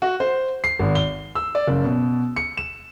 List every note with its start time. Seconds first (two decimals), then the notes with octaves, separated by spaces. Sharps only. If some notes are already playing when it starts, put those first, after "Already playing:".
0.02 F#4
0.20 C5
0.64 C7
0.79 G#1
0.95 G7
1.35 E6
1.55 D5
1.67 F#1
1.84 B2
2.36 C#7
2.57 E7